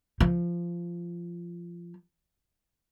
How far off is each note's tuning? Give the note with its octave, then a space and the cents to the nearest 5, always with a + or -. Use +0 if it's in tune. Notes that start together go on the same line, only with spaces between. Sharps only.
F3 -15